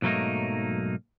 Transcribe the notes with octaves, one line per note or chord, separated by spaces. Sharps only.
B1 G#2 F#3 A3 A#3 D#4